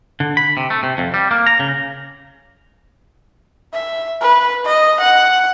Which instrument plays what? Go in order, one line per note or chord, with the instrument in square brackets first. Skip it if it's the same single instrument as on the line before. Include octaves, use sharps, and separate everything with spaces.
[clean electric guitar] D3
B5
C3
A3
C3
F2
G3
A#3
A#5
C#3
[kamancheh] E5
B4
D#5
F#5